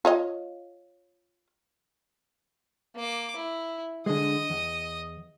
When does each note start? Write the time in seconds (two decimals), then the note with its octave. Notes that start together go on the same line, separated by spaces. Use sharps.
0.05 F4 C#5 D#5
2.95 A#3 D6
3.36 E4
4.06 D3 G#3 D#5 D#6
4.50 E2